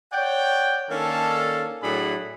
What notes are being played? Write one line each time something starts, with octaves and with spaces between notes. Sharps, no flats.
C#5 D5 F#5 G5
D#3 A#3 C#4 D4 A4
A2 F#3 D4 G#4 A4 B5